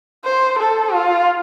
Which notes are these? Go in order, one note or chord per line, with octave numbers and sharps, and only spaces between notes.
C5
A4
F4